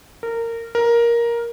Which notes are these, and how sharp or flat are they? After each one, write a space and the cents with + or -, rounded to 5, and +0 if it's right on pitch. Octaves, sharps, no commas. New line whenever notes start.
A#4 -20
A#4 +10